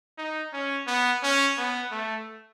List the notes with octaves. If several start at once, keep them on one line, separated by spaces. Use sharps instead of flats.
D#4
C#4
B3
C#4
B3
A3